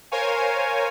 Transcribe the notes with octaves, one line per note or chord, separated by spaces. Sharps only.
A#4 C5 C#5 F5 G#5